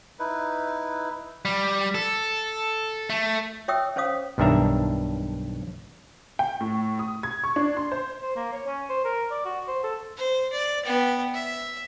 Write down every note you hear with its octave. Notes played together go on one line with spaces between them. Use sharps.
D#4 E4 B4
G3
A4
A3
C#5 E5 G5 D#6 E6
C#4 C5 C#5 F5 D#6
B1 G2 D#3 D4 E5 A#5
G5
A2
D#6
G#6
C#6
D4
C6
C5
C5
A#3
C#5
C#4
C5
A#4
D5
F#4
C5
A4
C5
D5
B3 G5
E5